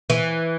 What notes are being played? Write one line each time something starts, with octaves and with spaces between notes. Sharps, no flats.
E3